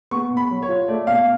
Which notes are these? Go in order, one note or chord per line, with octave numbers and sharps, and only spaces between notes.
B3 C#6
B2
B5
F#3
C#5
F4
A3 D5
B2 F5